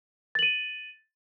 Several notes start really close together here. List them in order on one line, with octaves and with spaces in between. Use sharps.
A6 F#7 D#7